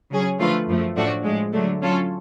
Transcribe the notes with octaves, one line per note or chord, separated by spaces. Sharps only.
C#3 F#3 C#4 G#4
D3 F3 A3 F4 B4
F#2 F3 A3
A2 F3 A3 D4 F#4
A2 F3 G#3
D3 F#3 A3 D4
F#3 C#4 F4 A4